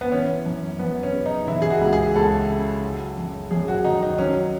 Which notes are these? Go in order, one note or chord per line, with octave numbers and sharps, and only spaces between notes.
B3
E3 C#4
F#2
F#2 B3
C#4
C#3
D#4
E3 E4
G#4
F#4
C#2
G#4
C#2 A4
C#3
F#3
F#2
F#2 G#4
F#4
D#3 D#4
D#4
F#3 C#4